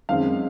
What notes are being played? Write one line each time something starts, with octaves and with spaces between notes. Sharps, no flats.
F#2 D#3 G#3 C4 F5